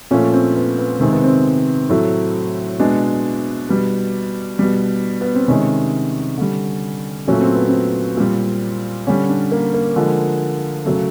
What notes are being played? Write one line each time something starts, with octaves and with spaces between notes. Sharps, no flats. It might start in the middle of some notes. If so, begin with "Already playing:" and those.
A#2 F3 A3 C#4
C4
B3
B3
C3 D#3 G#3 C4
B3
C4
A2 F#3 A3
B2 G#3 D4
B2 G3
B2 G3
B3
C4
C3 D#3 G#3 C#4
D3 G3
A#2 F#3 A3 C#4
C4
B3
C4
A#2 G3
D3 G3 C#4
D4
A#3
A#3
D3 F3 G#3
C#3 F#3 A3